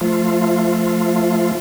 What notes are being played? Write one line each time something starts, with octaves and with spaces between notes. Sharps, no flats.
F3 A3 F4